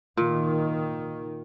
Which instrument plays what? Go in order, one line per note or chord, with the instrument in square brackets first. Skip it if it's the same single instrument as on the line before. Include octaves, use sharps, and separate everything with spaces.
[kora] A#2 [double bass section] D#3